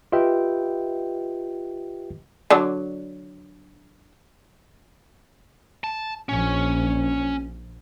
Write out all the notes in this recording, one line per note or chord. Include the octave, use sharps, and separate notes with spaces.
F4 G4 B4 D#5 E5 G5
D3 F#3 D4
A5
A#1 C#4